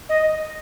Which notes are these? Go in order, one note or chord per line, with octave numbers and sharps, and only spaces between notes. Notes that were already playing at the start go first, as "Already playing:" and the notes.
D#5